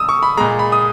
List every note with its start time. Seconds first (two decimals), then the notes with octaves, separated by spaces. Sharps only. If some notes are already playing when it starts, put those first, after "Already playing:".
Already playing: D#6 E6
0.09 C#6
0.23 B5
0.37 A#2 G#3 A#5
0.59 B5
0.72 D#6